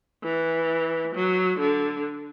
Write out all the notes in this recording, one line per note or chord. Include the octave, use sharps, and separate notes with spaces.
E3
F#3
D3